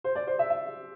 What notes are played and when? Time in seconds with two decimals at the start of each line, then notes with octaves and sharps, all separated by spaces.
0.04 C5
0.15 D5
0.27 C5
0.39 E5
0.50 E5